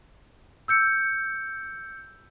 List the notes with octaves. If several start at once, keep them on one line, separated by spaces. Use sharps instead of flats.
E6 G6 C#7